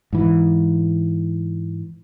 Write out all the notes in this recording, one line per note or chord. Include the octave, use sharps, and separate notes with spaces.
G#2 E3